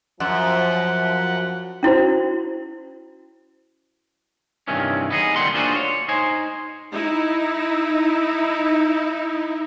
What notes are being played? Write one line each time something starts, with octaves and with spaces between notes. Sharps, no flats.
F#2 F3 F#5
C#4 E4 F#4 C5
G2 C3 D#3 E3 C#4
B3 D#4 G#4
D#3 F#3 G3 A3 F#5 C6
A#3 D4 F4 F#4 G#4 C5
C#5
D#4 C5 G#5
D#4 E4